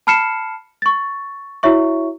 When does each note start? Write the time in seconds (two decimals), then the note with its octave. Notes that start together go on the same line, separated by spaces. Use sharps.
0.07 A5 B5 F6 C7 C#7 E7
0.82 C#6 A6
1.63 E4 F#4 C#5 E5 C#6